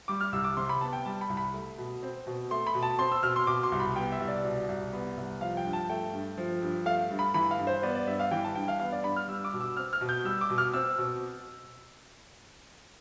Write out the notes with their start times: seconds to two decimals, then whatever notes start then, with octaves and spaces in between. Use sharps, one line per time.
0.08 G3 D6
0.20 F6
0.32 C2 E6
0.44 D6
0.57 C3 C6
0.69 B5
0.81 B3 A5
0.93 G5
1.06 G3 A5
1.21 B5
1.29 C2
1.37 B5
1.54 A3
1.78 B2
2.03 C4
2.27 B2
2.51 A3 C6
2.67 B5
2.75 B2
2.83 A5
2.99 C4 C6
3.12 E6
3.23 B2 F6
3.36 C6
3.47 B2 D6
3.63 C6
3.72 C2
3.80 B5
3.96 B3 G5
4.12 E5
4.20 C2
4.28 D5
4.44 B2
4.68 C2
4.93 B3
5.17 C2
5.41 F3 F5
5.57 G5
5.65 G2
5.73 A5
5.90 A3 G5
6.13 G2
6.38 F3
6.62 G2
6.86 A3 F5
7.10 G2
7.19 B5
7.34 E3 B5
7.51 F5
7.59 G2
7.67 C5
7.83 B3 D5
7.95 D5
8.07 G2 E5
8.20 F5
8.31 E3 G5
8.44 A5
8.55 G2 G5
8.68 F5
8.79 B3 F5
8.92 D5
9.04 G2 B5
9.16 F6
9.28 G3 E6
9.44 D6
9.53 B2
9.60 E6
9.77 C4 F6
9.93 F6
10.01 B2
10.09 G6
10.25 G3 E6
10.41 D6
10.50 B2
10.58 F6
10.74 C4 E6
10.98 B2